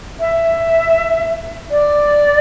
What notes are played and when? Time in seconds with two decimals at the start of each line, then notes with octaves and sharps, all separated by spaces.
0.19 E5
1.70 D5